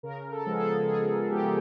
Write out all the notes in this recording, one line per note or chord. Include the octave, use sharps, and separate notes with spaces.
C#3 A#4
A4
F3 G#3 B3
G#4
A4
C#3 G#4
F3 G#3 B3 G4